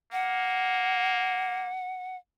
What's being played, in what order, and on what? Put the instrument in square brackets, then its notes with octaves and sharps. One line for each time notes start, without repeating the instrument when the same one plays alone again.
[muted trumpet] A#3 [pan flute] F#5